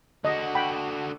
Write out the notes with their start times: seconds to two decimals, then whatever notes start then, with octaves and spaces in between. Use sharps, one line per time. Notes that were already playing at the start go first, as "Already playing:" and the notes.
0.25 D3 F#4 D#5
0.55 F#5 G5 B5